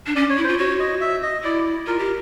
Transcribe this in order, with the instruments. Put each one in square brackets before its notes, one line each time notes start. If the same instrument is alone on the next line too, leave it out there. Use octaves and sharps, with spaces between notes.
[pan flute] D4
[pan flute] C#4 [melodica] D5
[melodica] C#5
[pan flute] E4
[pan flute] F4 [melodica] C5
[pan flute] F#4 [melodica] C#5
[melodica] D#5
E5
D#5
[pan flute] E4 [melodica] D5
[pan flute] F4 [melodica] A#4
[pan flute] G4